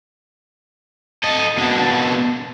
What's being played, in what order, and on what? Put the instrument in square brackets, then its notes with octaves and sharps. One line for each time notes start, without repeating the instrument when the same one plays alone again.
[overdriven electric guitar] A4 D#5
B2 D4